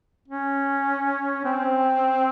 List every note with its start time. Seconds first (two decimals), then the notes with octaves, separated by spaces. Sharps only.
0.28 C#4
1.45 C4